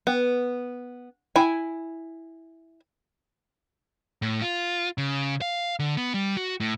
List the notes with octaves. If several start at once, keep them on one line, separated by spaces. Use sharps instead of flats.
B3
E4 G#5
A2
F4
C#3
F5
D3
B3
G3
F#4
A2